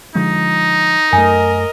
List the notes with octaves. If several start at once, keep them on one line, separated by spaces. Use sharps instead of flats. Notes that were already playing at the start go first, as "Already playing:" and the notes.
D3 F3 G#3 D#4
F#2 A3 A#4 D#5 G#5